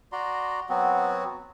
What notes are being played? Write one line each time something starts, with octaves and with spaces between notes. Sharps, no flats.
F#4 D5 A#5 C6
F#3 B3 C4 F#4